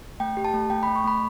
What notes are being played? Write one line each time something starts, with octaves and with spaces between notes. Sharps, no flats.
A3 G5
G4
A5
A3
A3 G5
B5
A3
C#6
A3 B5